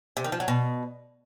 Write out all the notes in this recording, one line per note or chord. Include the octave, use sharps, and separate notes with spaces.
C3
D#3
F3
F#3
B2